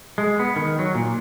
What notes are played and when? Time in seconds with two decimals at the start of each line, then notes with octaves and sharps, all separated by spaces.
0.18 G#3
0.39 B3
0.56 D#3
0.79 F#3
0.95 A#2